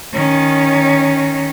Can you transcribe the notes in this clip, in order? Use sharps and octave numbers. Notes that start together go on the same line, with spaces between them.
D#3 C#4